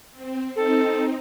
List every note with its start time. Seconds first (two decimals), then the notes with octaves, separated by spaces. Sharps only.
0.12 C4
0.56 C4 D#4 A4